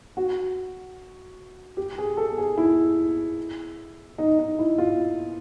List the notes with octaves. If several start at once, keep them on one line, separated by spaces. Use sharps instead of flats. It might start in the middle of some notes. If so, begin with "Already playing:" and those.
F#4
G4
G#4
A4
G#4
E4
D#4
D#4
E4
F4